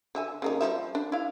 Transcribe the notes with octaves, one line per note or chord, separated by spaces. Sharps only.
D3 E5 G#5
C#3 A#3 D#4
F3 G3 E5
D4
E4 F5